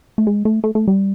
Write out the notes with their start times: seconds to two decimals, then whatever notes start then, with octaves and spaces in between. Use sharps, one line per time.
0.18 A3
0.27 G#3
0.45 A3
0.64 A3
0.75 A3
0.88 G3